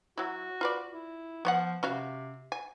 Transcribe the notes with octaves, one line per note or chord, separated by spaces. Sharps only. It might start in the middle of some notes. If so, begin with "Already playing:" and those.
F#3 E4 F#4
F4 B4 D5
E4
F3 B3 C#5 F#5
C3 C#4 F#4 F5
G#5